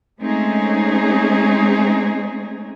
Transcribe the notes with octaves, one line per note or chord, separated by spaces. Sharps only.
G#3 A3 C4 C#4 D#4 G#4